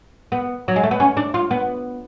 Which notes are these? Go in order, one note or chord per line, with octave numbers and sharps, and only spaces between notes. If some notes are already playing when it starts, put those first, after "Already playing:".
B3
F#3
G#3
A3
B3
C#4
D4
F4
B3